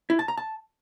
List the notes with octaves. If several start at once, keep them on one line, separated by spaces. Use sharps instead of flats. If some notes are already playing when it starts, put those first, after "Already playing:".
E4
A5
A#5
A5